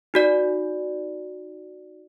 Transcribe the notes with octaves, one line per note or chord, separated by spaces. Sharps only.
D#4 F#4 D5